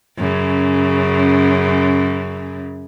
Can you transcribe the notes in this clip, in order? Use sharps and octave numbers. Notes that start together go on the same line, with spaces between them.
F#2 C#3